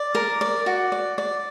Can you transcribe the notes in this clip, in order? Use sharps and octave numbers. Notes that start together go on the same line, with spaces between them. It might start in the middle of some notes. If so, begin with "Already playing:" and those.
Already playing: D5
A#4
D5
F#4
D5
D5